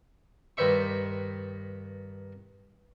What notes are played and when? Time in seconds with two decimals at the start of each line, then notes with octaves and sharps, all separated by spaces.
0.57 G2 D#3 B4 C5 E5 C#6